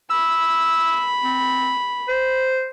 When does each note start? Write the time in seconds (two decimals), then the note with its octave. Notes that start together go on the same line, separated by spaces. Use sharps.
0.10 B5 E6
1.24 C4
2.08 C5